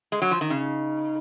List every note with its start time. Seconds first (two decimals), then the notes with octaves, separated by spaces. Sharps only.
0.12 G#3
0.22 F#3
0.31 F3
0.41 D#3
0.50 C#3 D#4